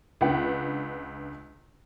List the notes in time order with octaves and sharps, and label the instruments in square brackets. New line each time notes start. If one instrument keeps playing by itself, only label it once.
[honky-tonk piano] C#2 D4 B4 F#5